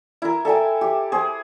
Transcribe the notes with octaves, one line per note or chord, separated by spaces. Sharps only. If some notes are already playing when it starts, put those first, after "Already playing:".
E4 A#4
A4 E5 G5 G#5
G4
G#4 C5